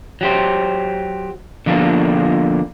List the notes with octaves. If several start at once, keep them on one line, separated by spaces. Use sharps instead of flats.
F#3 G4 C5
D3 F3 A#3 B3 D4